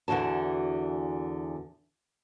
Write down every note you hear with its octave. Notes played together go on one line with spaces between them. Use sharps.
E2 D3 E3 F#4 A5